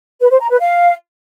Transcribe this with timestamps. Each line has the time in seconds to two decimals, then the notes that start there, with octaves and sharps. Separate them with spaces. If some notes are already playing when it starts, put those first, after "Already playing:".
0.21 B4
0.30 C5
0.40 A#5
0.50 B4
0.60 F5